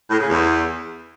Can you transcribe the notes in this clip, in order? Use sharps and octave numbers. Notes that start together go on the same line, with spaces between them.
A2
C#3
E2